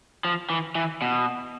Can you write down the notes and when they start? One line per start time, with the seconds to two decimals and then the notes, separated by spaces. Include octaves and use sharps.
0.25 F3
0.50 E3
0.75 E3
1.02 B2